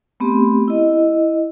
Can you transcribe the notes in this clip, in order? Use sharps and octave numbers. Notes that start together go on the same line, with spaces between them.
A3 B3 C4 G4
E4 D#5